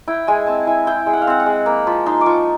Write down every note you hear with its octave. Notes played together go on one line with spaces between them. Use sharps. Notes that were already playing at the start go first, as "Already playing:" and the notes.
E4 G5
G#3 G#5
C4 A5
E4 G#5
E4 G5
G#3
F#5
F5
C4 F#5
F#5
G#3
A#3 B5
F3 B5
D#4 C6
D6
F3 C#6